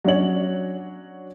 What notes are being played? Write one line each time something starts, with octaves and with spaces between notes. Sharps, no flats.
F#3 C#4 D4 F#4 C#5 F#7